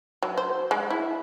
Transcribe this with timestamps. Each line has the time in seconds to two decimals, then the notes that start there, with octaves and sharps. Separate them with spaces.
0.23 F#3
0.38 C5
0.71 G#3
0.90 E4